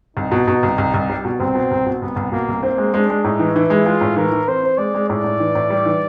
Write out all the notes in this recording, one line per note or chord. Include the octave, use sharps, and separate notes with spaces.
C2 D#4
B2
B2
C2
C2
C2
G3
B2
C2 C4
B2
C2
B2
C2 B3
C2
B2 A#3
C2
A#3 C4
G#3
G#3 D4
G#3
A2 D#4
E3
E3 E4
G#3
G#3 F4
A2
E3 A#4
E3
C4 C5
C4
G#3 D5
G#3
A2 D5
A2
E3
A2
G3
E3